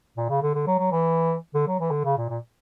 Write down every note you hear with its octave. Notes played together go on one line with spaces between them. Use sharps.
A#2
C#3
D3
D3
F#3
F#3
E3
D3
F#3
E3
D3
C#3
A#2
A#2